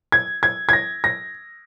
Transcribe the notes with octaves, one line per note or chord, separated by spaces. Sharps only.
G#6
G#6
G#6
A#6
A#6